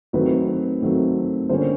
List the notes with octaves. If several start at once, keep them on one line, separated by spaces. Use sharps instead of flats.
D#3 F#3 A3 C4 B4
D#3 F#3 A3 C4
D3 G3 A#3 C#4 C5